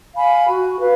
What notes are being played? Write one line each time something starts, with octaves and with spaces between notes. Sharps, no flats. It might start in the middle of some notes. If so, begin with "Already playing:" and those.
F5 G#5 B5
F#4
B4 F5